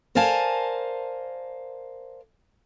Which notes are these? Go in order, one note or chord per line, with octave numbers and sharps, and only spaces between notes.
A#4 C5 D5 F5 G#5 A5